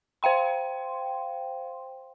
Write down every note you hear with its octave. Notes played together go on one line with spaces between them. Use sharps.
C5 F5 G5 C6